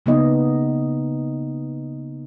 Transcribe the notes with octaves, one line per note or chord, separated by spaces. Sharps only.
C#3 A#3 B3 D#4 D#5